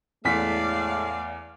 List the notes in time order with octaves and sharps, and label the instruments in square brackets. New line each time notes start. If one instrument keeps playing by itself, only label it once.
[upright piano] E2 B6 [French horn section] A2 G#3 A3 [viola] D5 F5